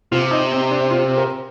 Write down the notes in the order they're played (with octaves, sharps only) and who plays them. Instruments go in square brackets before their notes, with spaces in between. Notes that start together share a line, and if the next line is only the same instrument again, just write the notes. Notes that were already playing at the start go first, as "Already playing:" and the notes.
[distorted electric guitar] C3 [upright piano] F4
[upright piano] D#4
C4
D4
F4
A#4